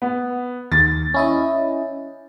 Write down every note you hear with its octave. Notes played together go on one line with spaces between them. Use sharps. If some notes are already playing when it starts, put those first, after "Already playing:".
B3
D#2 A6
C#4 E4 D#5